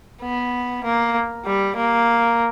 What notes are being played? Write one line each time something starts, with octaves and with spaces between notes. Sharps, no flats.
B3
A#3
G3
A#3